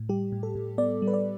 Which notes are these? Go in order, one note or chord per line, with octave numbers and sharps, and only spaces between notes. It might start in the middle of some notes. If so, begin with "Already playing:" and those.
Already playing: A2
G3 G4
A2
A4
A2
B3 D5
G3
B4
D5